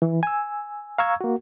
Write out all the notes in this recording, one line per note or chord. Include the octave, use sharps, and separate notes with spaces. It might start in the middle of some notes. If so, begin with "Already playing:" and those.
E3
G#5 E6
F5 A#5 C#6 E6 G#6
A#3 F#4